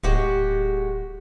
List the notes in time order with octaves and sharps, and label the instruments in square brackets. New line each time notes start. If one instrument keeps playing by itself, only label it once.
[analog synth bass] D1 [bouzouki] G#3 F#4 G4